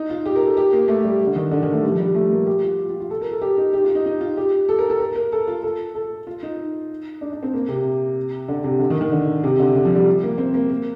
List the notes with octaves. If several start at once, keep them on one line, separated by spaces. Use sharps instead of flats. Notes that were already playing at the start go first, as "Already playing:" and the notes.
Already playing: D#4
F4
G4
A#4
A4
G4
A#3
A3
G3
D3
D#3
D3
D#3
A3
G3
F3
G3
A3
A#3
G4
F4
F4
F4
F4
A4
A#4
A4
G4
D#4
G4
F4
D#4
D#4
F4
G4
A4
A#4
A4
A#4
A#4
A4
F4
A4
A4
F4
D#4
D4
D4
C4
A#3
C3
D3
C3
D3
D#3
D#3
D3
C3
D3
D3
F3
G3
A#3
C4
A#3
A#3